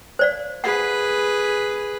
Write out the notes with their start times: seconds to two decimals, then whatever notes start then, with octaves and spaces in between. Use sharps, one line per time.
0.19 C5 D5 F5
0.64 G#4 B4 F#5